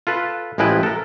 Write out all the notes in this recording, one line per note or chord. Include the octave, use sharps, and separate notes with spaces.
F4 A4 B4
A1 F3 G#3 E4 B4 G5
A4 A#4